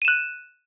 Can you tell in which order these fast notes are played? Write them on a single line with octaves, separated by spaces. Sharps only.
D#7 E7 F#6